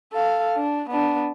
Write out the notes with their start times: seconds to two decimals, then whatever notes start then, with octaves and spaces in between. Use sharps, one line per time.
0.13 A4 F5
0.57 D4
0.90 B3 D4